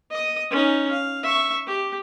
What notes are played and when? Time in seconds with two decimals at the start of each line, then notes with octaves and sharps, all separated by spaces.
0.11 D#5 D#6
0.51 C#4 D#4
0.92 F5
1.24 E5 C#6
1.67 G4